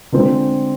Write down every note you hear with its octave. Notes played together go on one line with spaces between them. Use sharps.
D3 G#3 C4 F4